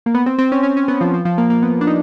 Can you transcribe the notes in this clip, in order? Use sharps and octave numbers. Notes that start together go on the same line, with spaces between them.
A#3
B3
C4
C4
C#4
C#4
C#4
B3
F3
F3
F3
A#3
A#3
B3
D4
D#4